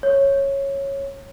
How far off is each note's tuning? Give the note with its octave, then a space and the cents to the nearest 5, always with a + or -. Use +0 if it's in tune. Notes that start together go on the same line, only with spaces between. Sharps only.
C#5 -10